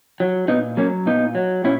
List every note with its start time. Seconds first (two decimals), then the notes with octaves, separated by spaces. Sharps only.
0.20 F#3
0.48 A#2 B3 D#4
0.77 F#3 A#3 C#4
1.06 A#2 B3 D#4
1.35 F#3
1.64 A#2 C#4 E4